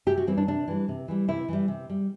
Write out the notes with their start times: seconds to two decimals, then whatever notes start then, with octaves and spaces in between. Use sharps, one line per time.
0.06 C3 G4
0.18 F#4
0.27 E3 G3 C4
0.37 D4
0.48 C3 D4
0.68 E3 G3
0.89 C3
1.08 E3 G3
1.28 C3 E4
1.49 E3 G3
1.68 C3
1.90 G3